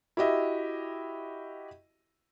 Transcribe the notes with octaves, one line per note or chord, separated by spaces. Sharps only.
E4 F#4 G4 D#5 E5